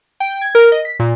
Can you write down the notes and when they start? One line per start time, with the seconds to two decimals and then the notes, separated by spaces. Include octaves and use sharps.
0.20 G5
0.41 G#6
0.55 A#4
0.72 D#5
0.85 B6
1.00 A#2